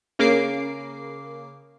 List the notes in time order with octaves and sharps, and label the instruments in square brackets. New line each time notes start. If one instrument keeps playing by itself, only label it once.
[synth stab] C#3 A#3 D6 C7